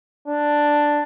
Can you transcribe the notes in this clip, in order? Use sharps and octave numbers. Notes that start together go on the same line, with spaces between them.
D4